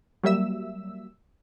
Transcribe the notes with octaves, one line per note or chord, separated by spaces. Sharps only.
F#3 G3 A#3 E5 E6